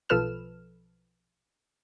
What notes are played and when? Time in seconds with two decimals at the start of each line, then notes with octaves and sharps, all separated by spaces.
0.09 B1 F3 A4 B4 F6 E7